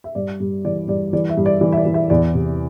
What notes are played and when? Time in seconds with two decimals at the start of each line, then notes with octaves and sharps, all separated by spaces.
0.04 E5
0.15 G2 D5
0.40 G2
0.65 E3 D5
0.88 G2 D5
1.13 E3 D5
1.29 E5
1.37 G2
1.46 D5
1.61 E3 D5
1.72 E5
1.77 D5
1.86 E3
1.94 E5
2.10 E2 D5
2.34 C3